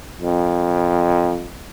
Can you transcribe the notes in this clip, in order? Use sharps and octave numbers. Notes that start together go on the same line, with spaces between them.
F2